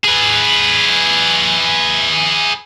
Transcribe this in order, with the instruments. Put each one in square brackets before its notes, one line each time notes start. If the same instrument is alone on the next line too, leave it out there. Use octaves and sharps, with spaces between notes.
[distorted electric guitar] G#4 B4